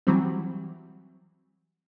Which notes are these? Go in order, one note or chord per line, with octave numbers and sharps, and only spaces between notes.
E3 F#3 G3 C4